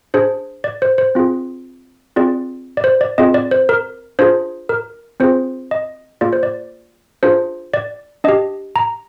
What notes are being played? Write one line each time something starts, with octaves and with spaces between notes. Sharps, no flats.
D4 G#4 C5
D5
C5
C5
C4 F4 G#4
C4 F4 G#4 D5
D5
C5
D5
C4 F4 G#4 D#5
D5
C5
A#4
D4 F4 G#4 C5
A#4
C4 F4 G#4 C5
D#5
A#3 F4 G#4 D5
C5
D5
D4 F4 G#4 C5
D5
D4 G4 D#5
A#5